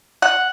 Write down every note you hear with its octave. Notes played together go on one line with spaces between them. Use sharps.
F#5